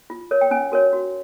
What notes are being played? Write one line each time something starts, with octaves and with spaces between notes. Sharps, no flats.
F4
A#4 C#5
G5
C#4 G#5
F#4 A#4 C#5
F#4